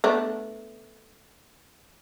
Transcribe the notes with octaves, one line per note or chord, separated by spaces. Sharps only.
A3 B3 D4